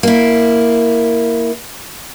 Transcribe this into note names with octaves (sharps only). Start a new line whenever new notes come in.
A#3 E4